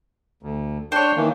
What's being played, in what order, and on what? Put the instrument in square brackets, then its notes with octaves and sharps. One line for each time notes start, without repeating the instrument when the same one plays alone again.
[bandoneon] D2
[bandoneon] D4 G5 [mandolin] C5 C#5
[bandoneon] D#3 E3 A#3